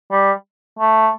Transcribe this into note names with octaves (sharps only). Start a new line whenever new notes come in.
G3
A3